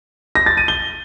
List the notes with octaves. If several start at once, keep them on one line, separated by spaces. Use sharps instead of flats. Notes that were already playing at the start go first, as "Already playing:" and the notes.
A#6
A6
D#7
G7